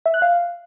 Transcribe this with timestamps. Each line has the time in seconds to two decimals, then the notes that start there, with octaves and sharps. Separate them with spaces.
0.06 E5
0.14 F#6
0.22 F5